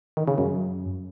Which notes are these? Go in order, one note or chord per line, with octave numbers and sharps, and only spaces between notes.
D#3
C#3
F#2